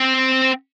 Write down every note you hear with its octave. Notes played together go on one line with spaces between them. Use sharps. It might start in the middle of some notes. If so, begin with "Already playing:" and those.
Already playing: C4